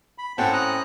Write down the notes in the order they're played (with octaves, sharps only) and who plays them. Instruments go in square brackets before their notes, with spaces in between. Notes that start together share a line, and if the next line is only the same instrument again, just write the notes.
[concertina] B5
[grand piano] A2 C4 C#4 [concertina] F#5 G5 A5
[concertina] A#5 D#6 F#6